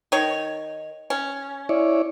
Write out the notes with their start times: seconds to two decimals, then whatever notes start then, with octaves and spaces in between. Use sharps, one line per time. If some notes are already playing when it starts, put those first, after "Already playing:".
0.12 D#3 C#5
1.10 C#4
1.69 E4 C#5 D5